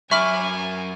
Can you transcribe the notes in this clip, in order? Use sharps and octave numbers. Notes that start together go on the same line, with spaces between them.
F#2 F#3 E5 G#5 B5 C#6 D6 F6